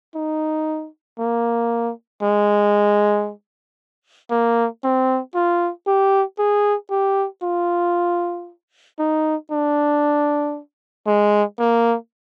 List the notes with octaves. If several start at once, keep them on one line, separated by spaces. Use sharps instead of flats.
D#4
A#3
G#3
A#3
C4
F4
G4
G#4
G4
F4
D#4
D4
G#3
A#3